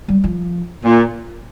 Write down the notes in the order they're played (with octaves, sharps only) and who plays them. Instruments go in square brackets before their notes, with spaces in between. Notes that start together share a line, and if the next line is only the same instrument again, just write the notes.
[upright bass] G3
F3
[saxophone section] A#2